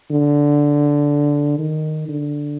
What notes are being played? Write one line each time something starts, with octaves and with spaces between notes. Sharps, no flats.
D3
D#3
D3